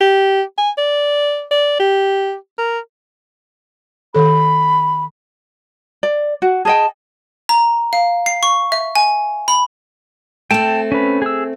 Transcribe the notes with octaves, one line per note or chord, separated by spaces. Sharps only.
G4
G#5
D5
D5
G4
A#4
D#3 A4 B5
D5
F#4
G#4 D#5 G5 A5
A#5
F5
C7
C#6
E5
G#5
B5
A3 C4 G5 A5
C#4 B4
G#4 E6